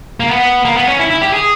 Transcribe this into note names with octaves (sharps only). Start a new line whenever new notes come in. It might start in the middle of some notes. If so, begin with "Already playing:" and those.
A#3
B3
A#3
B3
C#4
E4
E4
G4
G#4